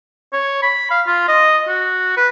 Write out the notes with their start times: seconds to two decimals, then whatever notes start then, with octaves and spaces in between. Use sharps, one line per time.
0.33 C#5
0.62 B5
0.91 F5
1.07 F4
1.28 D#5
1.68 F#4
2.17 B4